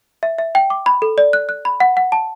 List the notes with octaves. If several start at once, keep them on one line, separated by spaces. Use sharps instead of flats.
E5
E5
G5
D6
B5
A4
D5
F#6
F#6
B5
F#5
F#5
A5